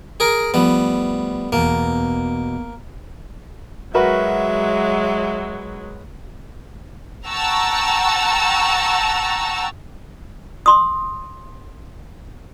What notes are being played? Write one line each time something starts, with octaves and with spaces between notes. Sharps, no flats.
G#4 A#4
F3 G3 A3 B3
E2 B2 A#3
F#3 G#3 F#4 A#4 B4 E5
F#5 G5 A5 A#5 C#6 E6
C6 D#6